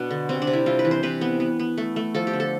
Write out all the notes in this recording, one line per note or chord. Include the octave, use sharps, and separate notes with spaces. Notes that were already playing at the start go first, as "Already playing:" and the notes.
Already playing: B2 B3 D4
D3
C3 C4
D4
C3
E4
G3 F4
B4
E3
C5
C3 B4
B3
B3
B3
A3
A3
F3 A4
G4
D3
A4